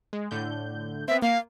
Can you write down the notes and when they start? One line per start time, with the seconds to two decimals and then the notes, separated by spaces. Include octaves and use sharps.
0.13 G#3
0.31 A2 D3 G6
1.08 B3 C4 E5
1.22 A#3 F5